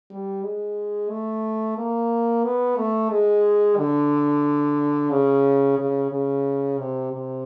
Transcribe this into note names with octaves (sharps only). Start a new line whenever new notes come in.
G3
G#3
A3
A#3
B3
A3
G#3
D3
C#3
C#3
C#3
C3
C3